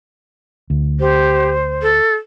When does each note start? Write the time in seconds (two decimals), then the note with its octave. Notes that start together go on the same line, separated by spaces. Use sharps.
0.70 D2
1.00 G4 C5
1.82 A4